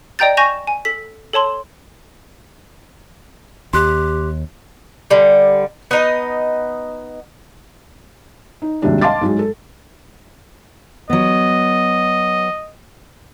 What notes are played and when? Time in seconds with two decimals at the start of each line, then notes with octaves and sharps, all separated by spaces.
0.19 D5 D#5 G5 A#5 G6 A6
0.37 G#5 C#6 G6 A#6 E7 F7
0.67 G#5
0.85 A4 B6
1.33 A4 C#5 A5 C6
3.73 D#2 G4 C6 F#6
5.11 D3 G3
5.91 B3 D#4 D#5
8.62 D#4
8.82 D#2 G#2 C3 F#3 G3 D4
9.01 D#5 F5 A5 C6 D6 A6
9.21 G#2 F#3 G#3
9.39 A4
11.10 F#3 B3 D#5